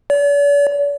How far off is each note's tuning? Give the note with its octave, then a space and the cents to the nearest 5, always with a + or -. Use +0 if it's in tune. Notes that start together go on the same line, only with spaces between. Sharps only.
D5 -45